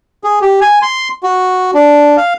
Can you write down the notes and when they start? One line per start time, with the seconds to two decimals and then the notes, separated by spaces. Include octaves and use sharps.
0.24 G#4
0.42 G4
0.62 G#5
0.82 C6
1.23 F#4
1.74 D4
2.17 F5